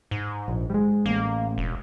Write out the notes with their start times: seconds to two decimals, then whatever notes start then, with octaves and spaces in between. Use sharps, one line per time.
0.11 G#2
0.48 A#1
0.70 G3 G#3
1.06 A1 A#3
1.58 E1